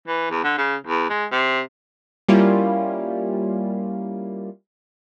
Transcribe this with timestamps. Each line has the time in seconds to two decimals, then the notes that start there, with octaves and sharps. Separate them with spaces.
0.08 E3
0.31 E2
0.44 D3
0.58 C#3
0.87 E2
1.10 G#3
1.31 C3
2.29 G3 A#3 C#4 E4 F4